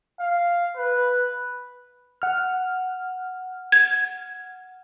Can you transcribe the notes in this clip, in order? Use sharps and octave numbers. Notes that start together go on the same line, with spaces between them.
F5
B4
F#5 F6
G#6